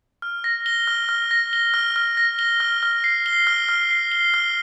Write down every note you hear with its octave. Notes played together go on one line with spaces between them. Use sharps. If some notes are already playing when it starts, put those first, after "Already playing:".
F6
A#6
G7
F6
F6
A#6
G7
F6
F6
A#6
G7
F6
F6
C7
G7
F6
F6
C7
G7
F6